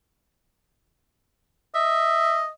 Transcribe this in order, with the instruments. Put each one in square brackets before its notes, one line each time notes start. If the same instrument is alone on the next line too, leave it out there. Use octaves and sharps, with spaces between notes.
[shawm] D#5 [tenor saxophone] E5